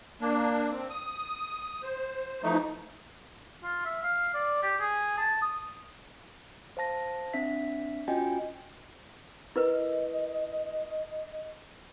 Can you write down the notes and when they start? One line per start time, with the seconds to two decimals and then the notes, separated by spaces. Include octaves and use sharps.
0.21 A#3 D4
0.71 C4
0.90 D#6
1.83 C5
2.43 E3 F3 A3 D#4
3.63 F4
3.85 E5
4.03 F5
4.34 D5
4.63 G4
4.80 G#4
5.18 A5
5.41 D#6
6.77 C5 F5 A5 A#6
7.34 C4 D4 E5 B6
8.08 C#4 F4 F#4 D#5 G5 G#5
9.56 E4 A#4 B4 D#5